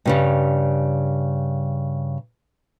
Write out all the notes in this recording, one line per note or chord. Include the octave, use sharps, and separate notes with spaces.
G2 C#3 G3